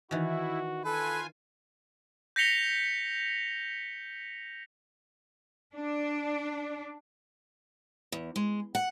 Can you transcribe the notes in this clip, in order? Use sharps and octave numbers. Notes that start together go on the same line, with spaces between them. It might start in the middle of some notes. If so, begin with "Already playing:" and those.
D#3 E3 E4 F#4
F4 A4 B4 G#5
G6 A#6 B6 C#7 F7 G7
D4
E2
G#3
F#5